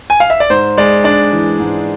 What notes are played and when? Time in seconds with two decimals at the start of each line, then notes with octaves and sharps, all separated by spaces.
0.10 G#5
0.20 F5
0.30 E5
0.40 D5
0.50 G#2 C5
0.78 G#3 D5
1.04 D4 D5
1.32 E3
1.60 G#2